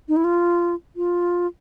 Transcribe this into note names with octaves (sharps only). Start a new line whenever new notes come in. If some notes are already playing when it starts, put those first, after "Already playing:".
D#4
E4
F4
F4